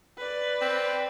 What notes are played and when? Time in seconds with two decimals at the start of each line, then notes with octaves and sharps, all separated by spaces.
0.17 B4 D5
0.62 C4